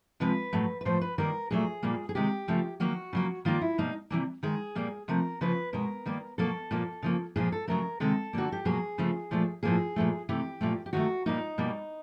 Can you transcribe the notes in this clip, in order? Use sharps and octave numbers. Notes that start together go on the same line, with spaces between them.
C3 F3 G#3 B4
A2 F#3 A3
B4
A2 F3 A3 C5
B4
D#3 G3 A#3 A#4
A#2 F#3 A3 G#4
A#2 G3 A#3
G#4
C3 D#3 G#3 G4
C#3 F3 A3
D#3 F#3 A#3 F#4
C#3 F#3 A#3
D#3 G3 A#3 F4
E4
B2 G3 A#3 D#4
C3 E3 G3 A#3
D#3 G#3 G#4
A#2 G3 A#3
C3 F3 A3 A#4
C#3 F3 A#3 B4
B2 G#3 A#4
D#3 G3 A#3
B2 F#3 A#3 A4
A#2 F3 A#3
C#3 F3 A#3
A#2 F3 A#3 G#4
A4
C#3 F#3 A3 A#4
C3 D#3 G#3 A4
D3 G3 A#3 F#4
G4
B2 F#3 A#3 G#4
C#3 F3 A3
A#2 F3 A3
A2 F3 A#3 G#4
A#2 F3 A3
C3 E3 A3 G4
A#2 F3 A3
G4
D#3 F#3 A3 F#4
A#2 G3 A#3 D#4
B2 G3 A#3